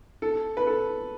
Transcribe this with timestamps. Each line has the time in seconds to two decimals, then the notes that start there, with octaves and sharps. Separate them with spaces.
0.22 A4
0.57 B4
0.67 A4